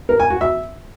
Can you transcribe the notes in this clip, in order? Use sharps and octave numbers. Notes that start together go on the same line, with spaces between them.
A#4
G#5
F#4
E5